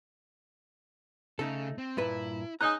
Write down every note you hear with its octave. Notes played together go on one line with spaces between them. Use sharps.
C#3 A3 D#4 A4
C4
G2 A#2 E4 B4
G#3 C#4 D#4 G#5 A#5 D#6 F#6